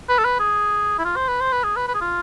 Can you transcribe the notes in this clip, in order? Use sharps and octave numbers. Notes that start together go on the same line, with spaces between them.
B4
A4
B4
G#4
E4
F4
C5
B4
C5
B4
G#4
B4
B4
G#4
F4